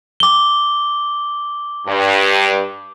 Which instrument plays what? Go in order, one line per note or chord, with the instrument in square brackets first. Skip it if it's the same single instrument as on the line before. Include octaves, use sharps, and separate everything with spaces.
[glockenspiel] D6 G7
[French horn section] G2